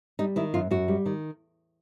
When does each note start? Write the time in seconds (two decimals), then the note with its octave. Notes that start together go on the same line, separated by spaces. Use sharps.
0.19 G3 D#4
0.36 D#3 E4
0.54 F#2 F4
0.71 F#2 F#4
0.88 G3
1.06 D#3